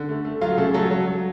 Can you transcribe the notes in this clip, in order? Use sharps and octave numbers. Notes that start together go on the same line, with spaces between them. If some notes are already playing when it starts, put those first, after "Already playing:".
Already playing: D3
A3
A3
F#3 F4 F5
C#3 A3 A4
F#3 A3 A4
F#3
F#3